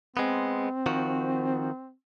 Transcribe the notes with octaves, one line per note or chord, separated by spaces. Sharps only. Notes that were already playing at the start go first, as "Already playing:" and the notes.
G#3 B3 C4
D#3 F3 F#4